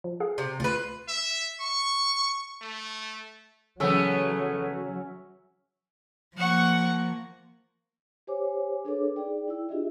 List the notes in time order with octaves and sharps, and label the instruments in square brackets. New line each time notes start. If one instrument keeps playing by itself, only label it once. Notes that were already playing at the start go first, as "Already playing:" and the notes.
[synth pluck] F3
G#4 F5
[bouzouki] C3
[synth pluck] D2 [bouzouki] F4 B4
[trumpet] E5
C#6
A3
[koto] C#3 E3 G5 [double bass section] F#3 [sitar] A3 B3 [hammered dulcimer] C#4 E5
[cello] F3 A#3 [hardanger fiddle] F#5 C#6
[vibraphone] G4 C5 C#5 G#5 D6
D4 G#4 A4 B4 C#5 D6
D#4 G#4 D5 G5
E4 E6
D4 F4 G4 G#4 D#5 E5